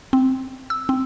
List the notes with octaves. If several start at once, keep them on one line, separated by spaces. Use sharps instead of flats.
C4
E6
C4